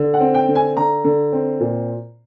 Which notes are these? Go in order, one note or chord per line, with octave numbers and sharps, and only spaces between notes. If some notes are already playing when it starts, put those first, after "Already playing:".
Already playing: D3
F#5
C4
G5
D3
G#5
D3 A#5
D3
C4
A#2